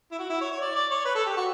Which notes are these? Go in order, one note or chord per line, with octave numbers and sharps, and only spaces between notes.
E4
F#4
E4
C#5
C#5
D5
D5
C#5
B4
A4
G4
F#4